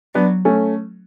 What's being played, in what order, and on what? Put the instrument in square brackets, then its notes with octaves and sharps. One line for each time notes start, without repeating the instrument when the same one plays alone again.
[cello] F#3 [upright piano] B3 D4
[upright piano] A3 C#4